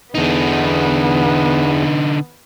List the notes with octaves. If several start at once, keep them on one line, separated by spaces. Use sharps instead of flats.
E2 D3 B3 D#4